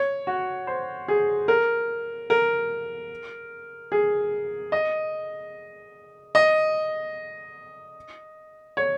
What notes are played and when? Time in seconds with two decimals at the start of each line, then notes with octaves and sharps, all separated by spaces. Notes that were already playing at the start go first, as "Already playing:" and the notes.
Already playing: C#5
0.27 F#4
0.67 C5
1.08 G#4
1.48 A#4
2.30 A#4
3.92 G#4
4.72 D#5
6.35 D#5
8.77 C#5